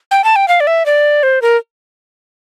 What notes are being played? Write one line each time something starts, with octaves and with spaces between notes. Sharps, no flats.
G5
A5
G5
F5
D5
E5
D5
C5
A#4